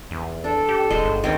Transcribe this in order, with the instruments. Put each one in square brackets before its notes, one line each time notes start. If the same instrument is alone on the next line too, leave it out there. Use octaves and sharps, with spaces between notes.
[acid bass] E2
[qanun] D4 [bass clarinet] A4
[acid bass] G4
[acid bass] D#1 [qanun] G#3 C5
[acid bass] G1
[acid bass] D2 [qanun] D#3 C4 C#4